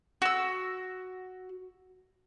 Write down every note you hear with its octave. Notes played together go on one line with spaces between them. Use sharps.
F#4 E6